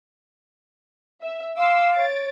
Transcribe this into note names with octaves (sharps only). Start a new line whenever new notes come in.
E5
F5 C6 D6 E6
C#5 A6 D7